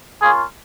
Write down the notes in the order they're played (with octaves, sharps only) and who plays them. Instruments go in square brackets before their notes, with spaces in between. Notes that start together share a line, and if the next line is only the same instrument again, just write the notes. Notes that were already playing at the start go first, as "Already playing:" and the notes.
[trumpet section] A#3 C#4 F4 G#4